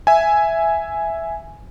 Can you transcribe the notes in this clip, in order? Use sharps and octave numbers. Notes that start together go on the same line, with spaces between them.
E5 G#5